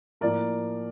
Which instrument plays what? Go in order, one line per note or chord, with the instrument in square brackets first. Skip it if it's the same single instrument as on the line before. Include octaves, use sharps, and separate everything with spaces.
[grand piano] A2 F3 A#3 A#4 D5